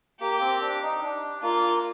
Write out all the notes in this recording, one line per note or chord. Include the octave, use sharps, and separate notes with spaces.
A#3 G4
C4
D4
D#4
D4
A#3 F4